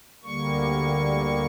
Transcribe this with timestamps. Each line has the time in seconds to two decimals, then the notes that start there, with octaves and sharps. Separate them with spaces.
0.23 D2 D3 G3 A#3 C#6